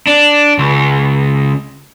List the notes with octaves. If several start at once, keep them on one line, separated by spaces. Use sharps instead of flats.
D4
C#2